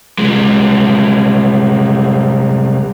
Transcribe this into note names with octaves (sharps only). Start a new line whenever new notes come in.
C2 G#3